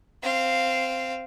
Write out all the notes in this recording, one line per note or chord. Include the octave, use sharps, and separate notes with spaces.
C4 F5